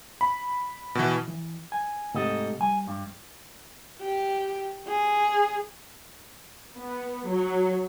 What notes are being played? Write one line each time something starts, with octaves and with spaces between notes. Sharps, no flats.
B5
B2 E3
E3
G#5
G#2 C3 A3 G4 A4 D#5
G3 G#5
G2
G4
G#4
B3
F#3